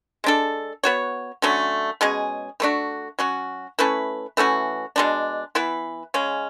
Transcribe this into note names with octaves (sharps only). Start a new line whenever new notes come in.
G#3 D4 A4
B3 F#4 C#5
D3 F#3 A3 C#4
B2 G#3 C#4 G#4
E3 A3 D4 F#4
F#3 C#4 F#4
A3 C#4 E4 B4
E3 A3 C#4 F#4
B2 G#3 D4
E3 B3 E4 B4
C#3 G#3 C#4